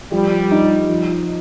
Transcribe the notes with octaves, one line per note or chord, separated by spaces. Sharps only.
F3 G3
D#4
F3